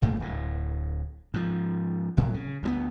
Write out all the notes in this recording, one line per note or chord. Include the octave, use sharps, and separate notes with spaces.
E1 G2 A3 A#3
D1 A2
G#2 F3
G#1 A2 C3 F#3
C#3
D2 F3 B3